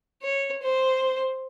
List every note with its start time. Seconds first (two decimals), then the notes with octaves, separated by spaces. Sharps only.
0.22 C#5
0.62 C5